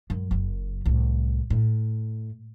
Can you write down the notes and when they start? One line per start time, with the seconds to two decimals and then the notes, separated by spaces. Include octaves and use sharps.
0.10 F#2
0.31 F#1 F#2
0.86 C2 A2
1.50 A2